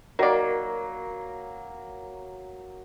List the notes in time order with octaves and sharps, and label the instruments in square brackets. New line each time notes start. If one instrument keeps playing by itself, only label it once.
[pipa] D#3 D5 [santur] F#3 A#3 [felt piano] A#4